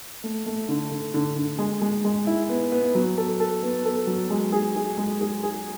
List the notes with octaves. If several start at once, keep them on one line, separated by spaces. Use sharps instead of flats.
A3
A3
D3
D3
D3
D3
G#3
G#3
G#3
E4
B3
B3
F#3
A4
A4
B3
A4
F#3
G#3
G#4
G#4
G#3
G#4
G#4